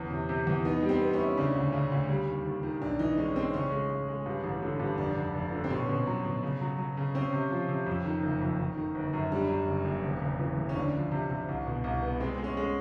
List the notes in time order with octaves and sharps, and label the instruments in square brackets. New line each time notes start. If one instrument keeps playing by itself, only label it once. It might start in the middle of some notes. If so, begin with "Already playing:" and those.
Already playing: [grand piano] E2 [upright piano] C#4
[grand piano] C3
C3
E2
[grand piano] B3 [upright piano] D#4
[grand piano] G3
[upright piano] C4
[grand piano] B3
[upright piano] C#4
[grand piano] E4
[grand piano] C#3 [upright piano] D4
[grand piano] D2
C#3
D2
G3
D#2
D#2
D#3
[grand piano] B1 [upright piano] D4
[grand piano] E3 [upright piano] D#4
[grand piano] G#3 [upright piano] C#4
[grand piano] G#3 [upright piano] C4
[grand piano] C#3 [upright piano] C#4
[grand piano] G#3
G#3
G#3
G2
A1
D3
G2
[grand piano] F1 [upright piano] D4
[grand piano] F1
F1
D3
[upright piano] C4
[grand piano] B2 [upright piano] C#4
[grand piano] B2
F#3
B2
C#3
F#3
F#3
C#3
[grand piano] C4 [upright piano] C#4
[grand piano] C3
F3
C3
F2
D#3
F#1
F2
D#3
D#3
G1
F#2
[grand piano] G3 [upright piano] D4
[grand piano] F#2
F#1
F#1
E1
C#3
E3
E3
[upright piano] C#4
[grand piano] D2 [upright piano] D4
[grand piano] F3
C3
C3
C2
B2
C2
B3
[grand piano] G#3 [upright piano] C4
[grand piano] G#3
[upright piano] C#4
[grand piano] G#3